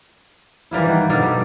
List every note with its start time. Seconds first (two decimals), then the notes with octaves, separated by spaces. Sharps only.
0.71 E3 G3 A#3 E4
0.86 D#3 F#5
1.09 B2 D4 A4 A#4
1.22 G3